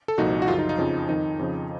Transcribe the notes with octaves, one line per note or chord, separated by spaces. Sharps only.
A4
C2 A#2 F3 D#4 F#4
F#4
F#2 C#3 F3 F4
D#4
D#4
F2 C#3 F3
F2 D#3 D#4
F2 C#3 F3